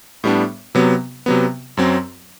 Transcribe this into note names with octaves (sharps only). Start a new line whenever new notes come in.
A2 G3 B3 D4
C3 F#3 B3
C3 F#3 B3
F#2 F#3 C4